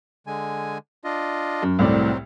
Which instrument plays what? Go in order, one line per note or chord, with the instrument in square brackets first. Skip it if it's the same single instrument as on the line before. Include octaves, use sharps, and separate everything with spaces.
[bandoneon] D3 G#3 G#5
D4 F4 D#5
[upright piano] F#2
[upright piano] C2 A2 D5 [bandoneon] F#3 C4